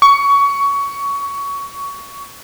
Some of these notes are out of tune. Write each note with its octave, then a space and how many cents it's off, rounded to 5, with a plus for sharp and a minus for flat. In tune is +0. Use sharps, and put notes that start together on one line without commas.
C#6 +20